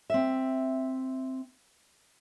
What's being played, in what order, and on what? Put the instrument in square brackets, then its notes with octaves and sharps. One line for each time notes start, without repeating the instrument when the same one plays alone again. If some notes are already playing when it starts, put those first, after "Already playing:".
[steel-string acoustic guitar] C4 E5